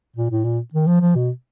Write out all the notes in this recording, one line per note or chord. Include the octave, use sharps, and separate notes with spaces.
A#2
A2
A#2
D#3
F3
F3
B2